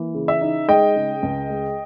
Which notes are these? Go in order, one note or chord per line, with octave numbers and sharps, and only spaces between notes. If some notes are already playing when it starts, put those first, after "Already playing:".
Already playing: E3 A#3
C#3
E5
D#4
G#3 D#5 G5
C#3
C#2
G#3